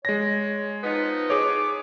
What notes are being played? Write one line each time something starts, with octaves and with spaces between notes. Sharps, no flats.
G#3 C#5 A#6
F3 B3 D#4
G#4 C#5 D6